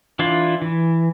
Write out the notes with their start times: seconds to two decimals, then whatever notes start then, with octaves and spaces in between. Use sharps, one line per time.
0.19 E3 D4 E4 F4
0.62 E3